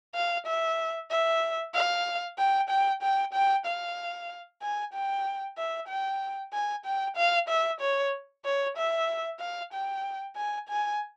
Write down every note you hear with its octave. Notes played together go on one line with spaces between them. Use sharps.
F5
E5
E5
F5
G5
G5
G5
G5
F5
G#5
G5
E5
G5
G#5
G5
F5
E5
C#5
C#5
E5
F5
G5
G#5
G#5